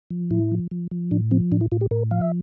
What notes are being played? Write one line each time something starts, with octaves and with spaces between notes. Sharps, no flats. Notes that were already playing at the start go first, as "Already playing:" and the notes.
F3
A2 E4
F3
F3
F3
A2 D4
F3 C4
A2 D4
E4
A2 F4
G4
A2 A#4
F3 F5
E5